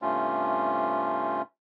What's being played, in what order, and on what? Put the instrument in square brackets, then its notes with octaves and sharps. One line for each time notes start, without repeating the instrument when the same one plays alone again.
[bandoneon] G2 C3 A3 C#4 F4